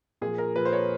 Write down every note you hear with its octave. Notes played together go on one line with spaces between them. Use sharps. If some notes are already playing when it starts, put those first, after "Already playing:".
A#2 F3 G#4
A#4
A#2 F3 B4
C5
C#5